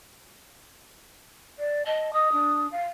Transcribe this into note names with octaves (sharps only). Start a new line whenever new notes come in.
D5
D#5 A5
D#5 D#6
D4
F5